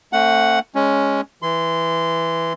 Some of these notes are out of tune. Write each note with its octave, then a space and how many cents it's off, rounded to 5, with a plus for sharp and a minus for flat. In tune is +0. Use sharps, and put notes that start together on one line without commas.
A3 +30 C4 +45 F#5 +0
G#3 +0 C#4 +0
E3 +0 C6 -20